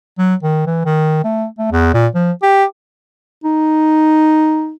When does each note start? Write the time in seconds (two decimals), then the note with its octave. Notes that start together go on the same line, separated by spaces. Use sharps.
0.19 F#3
0.43 D#3
0.66 E3
0.86 D#3
1.24 A3
1.58 A3
1.72 E2
1.94 A#2
2.15 F3
2.42 G4
3.44 D#4